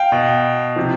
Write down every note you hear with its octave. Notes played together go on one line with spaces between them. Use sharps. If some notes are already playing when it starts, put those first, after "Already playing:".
Already playing: F5 G5
B2
C3 F3